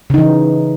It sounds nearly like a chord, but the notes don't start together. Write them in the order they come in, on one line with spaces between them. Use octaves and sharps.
C#3 D#4 E3